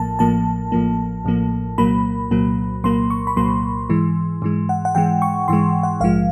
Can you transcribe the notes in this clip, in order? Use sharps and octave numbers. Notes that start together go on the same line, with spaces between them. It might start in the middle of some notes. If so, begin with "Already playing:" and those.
Already playing: A1 A2 F3 A#3 A5
A1 A2 F3 A#3 A5
A1 A2 F3 A#3
A1 A2 F3 A#3
C2 A#2 F#3 A#3 B5
C2 A#2 F#3 A#3
C2 A#2 F#3 A#3 C6
C#6
B5
C2 A#2 F#3 A#3 C6
G#2 E3 G#3
G#2 E3 G#3
F#5
F#5
G#2 E3 G#3 G5
C#6
G#2 E3 G#3 C6
F#5
A#1 G#2 F3 G#3 F5